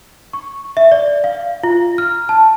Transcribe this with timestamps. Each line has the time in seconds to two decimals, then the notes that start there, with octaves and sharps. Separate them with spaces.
0.33 C#6
0.77 E5
0.92 D5
1.24 F5
1.64 F4
1.98 F6
2.29 A5